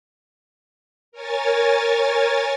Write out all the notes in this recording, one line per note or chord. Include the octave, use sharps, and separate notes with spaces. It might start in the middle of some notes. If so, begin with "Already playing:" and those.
A#4 C#5 G#5 A6